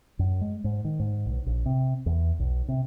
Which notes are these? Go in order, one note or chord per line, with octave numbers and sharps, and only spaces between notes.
F#2
G#3
G#2
D#3
G#2
B1
A#1
C3
E2
B1
C3